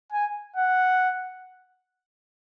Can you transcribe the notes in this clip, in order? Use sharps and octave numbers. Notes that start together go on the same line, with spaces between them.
G#5
F#5